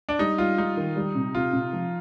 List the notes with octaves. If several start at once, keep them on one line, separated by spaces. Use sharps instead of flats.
D4
G3 D#4
G3 F4
G3 D#4
D#3
G3
C3
C3 F4
C3
F3